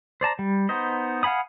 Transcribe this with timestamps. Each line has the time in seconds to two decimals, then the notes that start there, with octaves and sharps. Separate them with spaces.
0.21 C5 D5 A5 A#5
0.39 G3
0.69 B3 D#4 C5 D#5
1.23 F5 F#5 G#5 B5 D#6